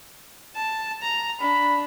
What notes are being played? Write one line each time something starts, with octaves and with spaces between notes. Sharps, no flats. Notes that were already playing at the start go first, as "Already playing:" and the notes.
A5
A#5
D4 B5